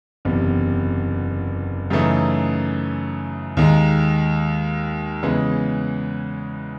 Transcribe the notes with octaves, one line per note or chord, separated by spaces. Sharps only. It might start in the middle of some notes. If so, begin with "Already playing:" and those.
F#1 E2 C3
F#2 C#3 E3 A3 D#4
D#2 D#3 G#3
E2 C#3 E3 G#3